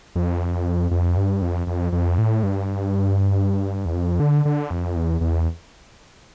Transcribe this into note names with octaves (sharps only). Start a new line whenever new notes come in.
F2
F2
G2
F2
F2
F2
A2
G2
E2
F2
D3
D3
F2
E2
E2